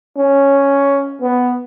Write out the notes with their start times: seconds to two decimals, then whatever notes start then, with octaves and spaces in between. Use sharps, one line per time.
0.17 C#4
1.21 B3